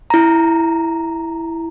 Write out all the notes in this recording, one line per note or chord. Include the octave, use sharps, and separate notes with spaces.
E4 A#5